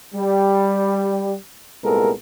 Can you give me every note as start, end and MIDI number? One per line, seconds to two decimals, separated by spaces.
0.15 1.36 55
1.84 2.11 36
1.84 2.11 46
1.84 2.11 56
1.84 2.11 59
1.84 2.11 69
1.84 2.11 70